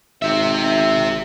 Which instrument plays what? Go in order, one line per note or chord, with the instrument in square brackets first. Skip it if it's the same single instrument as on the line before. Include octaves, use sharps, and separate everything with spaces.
[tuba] G#1 [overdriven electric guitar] G4 E5